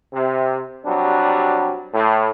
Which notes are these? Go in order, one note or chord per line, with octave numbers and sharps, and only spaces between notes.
C3
C3 F#3 G3 D4
A2